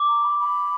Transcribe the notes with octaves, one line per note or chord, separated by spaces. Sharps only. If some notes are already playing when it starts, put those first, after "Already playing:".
Already playing: D6
A#5
B5
B5